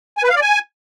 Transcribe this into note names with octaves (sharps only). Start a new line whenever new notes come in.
G#5
B4
F5
D5
G#5